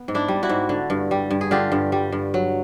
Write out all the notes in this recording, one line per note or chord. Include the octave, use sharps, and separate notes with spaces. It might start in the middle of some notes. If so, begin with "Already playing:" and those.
Already playing: B3
G#2
D4 E4
G3
E4 F#4
G#2
D3
G2
G3
G2
G#4
D3 F4 G4
G2
G3
G2
F#3